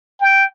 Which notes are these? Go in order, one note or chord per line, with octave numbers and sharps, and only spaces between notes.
G5